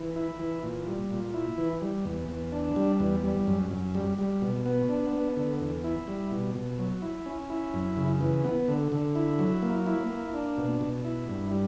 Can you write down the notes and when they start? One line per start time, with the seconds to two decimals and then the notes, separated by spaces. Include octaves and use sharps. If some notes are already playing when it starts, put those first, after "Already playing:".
Already playing: E3
0.16 E4
0.39 E3
0.63 A#2
0.87 G3
1.11 A#2
1.34 E4
1.58 E3
1.81 G3
2.05 E2
2.29 E2
2.52 D4
2.76 G3
3.00 E2
3.24 G3
3.47 F#2
3.71 F#2
3.95 G3
4.18 G3
4.42 B2
4.66 B3
4.89 D4
5.13 B3
5.37 D3
5.60 E2
5.84 E4
6.08 G3
6.31 B2
6.55 B2
6.79 F#3
7.02 E4
7.26 C#4
7.50 E4
7.74 F#2
7.97 C#3
8.21 E3
8.44 B3
8.68 D3
8.92 D3
9.15 E4
9.39 F#3
9.62 A#3
9.86 E4
10.10 A#3
10.34 D4
10.57 B2
10.81 B2
11.05 E4
11.29 G2
11.52 G3